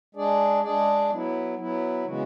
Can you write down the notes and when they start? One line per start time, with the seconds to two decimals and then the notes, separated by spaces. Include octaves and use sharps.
0.15 G#3 D4 G#4 D5
0.63 G#3 D4 G#4 D5
1.10 F#3 B3 E4
1.59 F#3 B3 E4
2.05 C#3 E3 G#3 B3 F#4